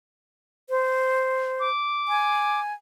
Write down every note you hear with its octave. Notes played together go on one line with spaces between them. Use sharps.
C5
D6
G#5